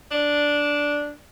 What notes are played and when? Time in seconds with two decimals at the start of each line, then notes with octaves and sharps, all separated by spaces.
0.11 D4